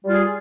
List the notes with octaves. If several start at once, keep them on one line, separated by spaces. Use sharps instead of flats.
G3 F4 G#4